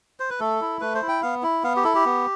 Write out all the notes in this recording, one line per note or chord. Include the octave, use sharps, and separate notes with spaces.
C5
B4
A3 A4
E4
A3 B4
C5
E4
G5
B3 F5
E4
B3 F5
G4
E4 A4
G4
B3